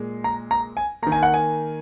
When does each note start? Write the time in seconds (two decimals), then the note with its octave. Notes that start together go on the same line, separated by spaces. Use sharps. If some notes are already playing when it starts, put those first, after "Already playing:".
Already playing: A#2 G#3
0.24 A#5
0.51 A#5
0.77 G#5
1.02 D#3 A#3 A#5
1.12 G#5
1.23 F#5
1.34 G#5